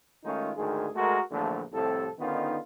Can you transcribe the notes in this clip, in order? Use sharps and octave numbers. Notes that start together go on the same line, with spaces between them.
D#3 G#3 A3 C#4 D#4 F4
D2 G#2 D#3 G#4
G#3 A3 F#4 A#4
A#1 E2 D3 F3 A3
C2 A2 C3 F3 A4
D3 D#3 B3 C#4 D#4 F4